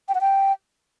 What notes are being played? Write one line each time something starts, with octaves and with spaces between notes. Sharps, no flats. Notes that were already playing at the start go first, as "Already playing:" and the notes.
G5
F#5
G5